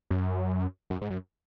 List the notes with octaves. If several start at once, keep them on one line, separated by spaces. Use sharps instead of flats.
F#2
F#2
G#2
F#2